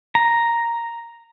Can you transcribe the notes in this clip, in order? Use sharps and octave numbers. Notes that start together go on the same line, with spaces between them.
A#5